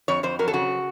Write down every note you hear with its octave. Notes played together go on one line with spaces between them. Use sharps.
F2 C#5
F2 C5
F#3 A#4
A4
C#3 F#4